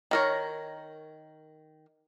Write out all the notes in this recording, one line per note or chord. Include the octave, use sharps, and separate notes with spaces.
D#3 A#4 C#5